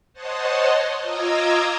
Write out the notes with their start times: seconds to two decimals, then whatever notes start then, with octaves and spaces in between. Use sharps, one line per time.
0.13 C5 C#5 D#5 F#5 A5 C6
1.01 F4 D#5 A#5 D6 E6 G#6